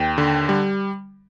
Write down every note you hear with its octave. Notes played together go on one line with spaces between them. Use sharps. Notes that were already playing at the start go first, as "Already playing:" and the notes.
Already playing: D#2 G5
D3
G3